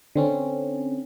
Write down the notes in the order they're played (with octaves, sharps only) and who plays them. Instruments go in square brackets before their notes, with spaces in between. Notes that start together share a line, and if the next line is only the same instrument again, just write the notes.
[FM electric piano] D3 C4 C#4